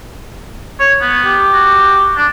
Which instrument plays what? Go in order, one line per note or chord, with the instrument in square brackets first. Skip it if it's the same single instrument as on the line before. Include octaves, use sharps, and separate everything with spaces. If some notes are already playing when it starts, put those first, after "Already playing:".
[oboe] C#5
B3
[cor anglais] G4
[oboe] F#4
D4